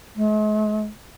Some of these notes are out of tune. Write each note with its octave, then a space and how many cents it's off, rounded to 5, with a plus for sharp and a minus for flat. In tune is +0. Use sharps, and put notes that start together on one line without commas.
G#3 +45